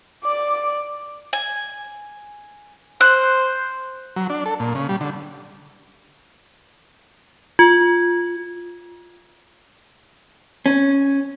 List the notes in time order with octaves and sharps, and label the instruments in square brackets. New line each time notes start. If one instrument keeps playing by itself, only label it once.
[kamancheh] D5 [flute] D6
[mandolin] G#5
[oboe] C5 [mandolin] F#6
[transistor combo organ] F#3
D4
A4
A#2
C#3
G3
D3
[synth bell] F4
[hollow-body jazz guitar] C#4